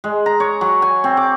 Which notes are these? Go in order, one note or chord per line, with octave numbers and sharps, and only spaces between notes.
G#3
A#5
C#5
F#3
G#5
C4
D6